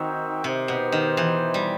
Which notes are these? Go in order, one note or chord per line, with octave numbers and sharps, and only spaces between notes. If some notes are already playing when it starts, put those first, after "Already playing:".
Already playing: D#3 C4 D#4 F#4 C5 E5 G5
C3 D#4 G4 C5
B2
D#3
E3
G3